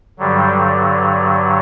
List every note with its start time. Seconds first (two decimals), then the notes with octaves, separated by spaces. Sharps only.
0.19 G2 D3 F#3 G3